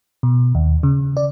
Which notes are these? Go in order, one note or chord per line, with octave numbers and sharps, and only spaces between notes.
B2
D#2
C#3
D5